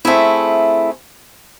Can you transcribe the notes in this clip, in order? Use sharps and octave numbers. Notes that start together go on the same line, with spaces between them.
A3 C4 E4 G#4